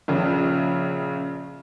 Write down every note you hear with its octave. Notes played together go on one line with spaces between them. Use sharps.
A#1 C#3